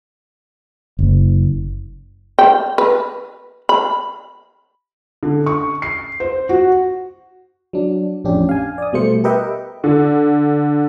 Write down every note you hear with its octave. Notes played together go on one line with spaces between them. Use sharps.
F#1
G5
B4
B5
D3
C#6
C7
C5
F#4
F#3 D4
A1 F2 C#4 D4 G4
F5 G#5
D5 D#6
B2 G3 A3 C5 C#7
G4 A#4 B4 D#5 E5 G5
D3